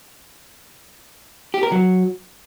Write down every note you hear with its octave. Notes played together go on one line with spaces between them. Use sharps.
G4
A#4
F#3